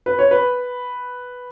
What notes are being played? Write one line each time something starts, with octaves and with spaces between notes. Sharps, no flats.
B4
C#5
B4